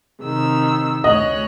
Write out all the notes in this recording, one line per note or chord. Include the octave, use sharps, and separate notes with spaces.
C3 D#3 E6
D2 C#5 D#5 F#6